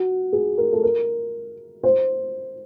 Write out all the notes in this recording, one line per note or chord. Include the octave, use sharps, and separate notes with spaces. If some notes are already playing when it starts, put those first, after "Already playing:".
Already playing: F#4
G#4
A#4
A4
A#4
C5